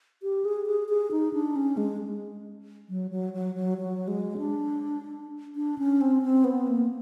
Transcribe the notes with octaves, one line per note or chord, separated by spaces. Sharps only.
G4
G#4
G#4
G#4
D#4
D4
C#4
G#3
F#3
F#3
F#3
F#3
F#3
G#3
D4
D4
C#4
C4
C4
B3
A#3